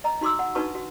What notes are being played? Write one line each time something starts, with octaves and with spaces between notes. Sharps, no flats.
D#5 A#5
D#4 F#4 C6 D6 E6
F#5
D4 D#4 F#4 B4 A5 C#6
F#4